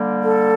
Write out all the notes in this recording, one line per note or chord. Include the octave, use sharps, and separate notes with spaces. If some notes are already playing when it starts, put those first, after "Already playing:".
Already playing: D3 G3 A#3
A4